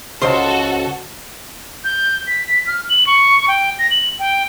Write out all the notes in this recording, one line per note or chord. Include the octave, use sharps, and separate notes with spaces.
C#2 F#4 A4 C5 C6
G6
B6
F6
F#7
C#6
G5
A#6
F#7
G5